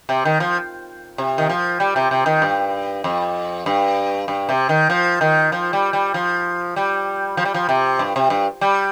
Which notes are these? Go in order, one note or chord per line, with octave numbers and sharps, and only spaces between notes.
C3
D#3
F3
C3
D#3
F3
G3
C3
C3
D#3
G2
F2
G2
G2
C3
D#3
F3
D#3
F3
G3
G3
F3
G3
F3
G3
F3
C3
G2
C3
G2
G3